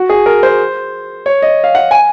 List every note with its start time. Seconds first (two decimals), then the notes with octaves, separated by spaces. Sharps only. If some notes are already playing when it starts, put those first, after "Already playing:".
Already playing: F#4
0.10 G#4
0.26 A#4
0.43 C5
1.26 C#5
1.42 D#5
1.64 F5
1.75 F#5
1.91 G#5